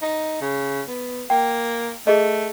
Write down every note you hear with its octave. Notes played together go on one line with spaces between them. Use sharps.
D#4
C#3
B3
A#3 G5
A3 G#4 D#5